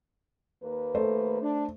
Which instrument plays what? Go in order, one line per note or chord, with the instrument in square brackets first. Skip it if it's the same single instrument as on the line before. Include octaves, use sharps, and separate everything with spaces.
[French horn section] D#2 A#3 B4
[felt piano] A3 A4 C5
[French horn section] D4